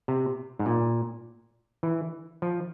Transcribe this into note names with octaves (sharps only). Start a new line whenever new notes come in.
C3
G#2
A#2
E3
F3